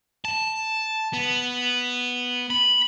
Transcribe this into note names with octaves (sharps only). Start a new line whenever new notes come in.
A5
B3
B5